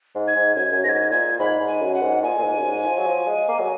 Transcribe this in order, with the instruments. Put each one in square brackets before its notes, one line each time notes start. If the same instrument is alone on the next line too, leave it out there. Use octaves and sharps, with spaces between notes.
[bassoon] G#2
[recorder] G#6
[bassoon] G#2
[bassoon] F#2 [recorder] G#6
[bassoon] F#2
[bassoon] G#2 [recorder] G#6 A#6
[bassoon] A#2 [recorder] G#6
[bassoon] G#2 [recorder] B5
[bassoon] G#2
[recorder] G#5
[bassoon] F#2
[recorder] F#5
[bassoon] G#2
[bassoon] A#2 [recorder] G#5
[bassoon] A#2
G#2
F#2
G#2
F3
F#3
F3
G#3
A#3
F#3